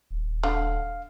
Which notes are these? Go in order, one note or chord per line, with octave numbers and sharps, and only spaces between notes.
D#1
D3 F5